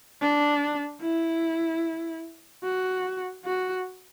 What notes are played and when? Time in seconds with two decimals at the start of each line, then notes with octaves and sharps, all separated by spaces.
0.22 D4
1.02 E4
2.63 F#4
3.45 F#4